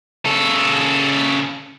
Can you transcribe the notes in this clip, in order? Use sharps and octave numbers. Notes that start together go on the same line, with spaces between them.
C#3 A4